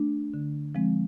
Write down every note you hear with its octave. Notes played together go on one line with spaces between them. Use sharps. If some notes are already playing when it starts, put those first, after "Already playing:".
Already playing: A3 D4
D3
F3 G#3 C4